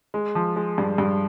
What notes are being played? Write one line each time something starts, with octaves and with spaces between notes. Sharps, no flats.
G#3
F3
G#3
G2
G2